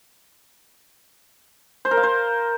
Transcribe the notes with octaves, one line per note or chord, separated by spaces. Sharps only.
C5
A#4
F5
C5